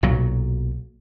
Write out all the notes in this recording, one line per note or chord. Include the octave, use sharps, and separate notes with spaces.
B1 A#2 F#3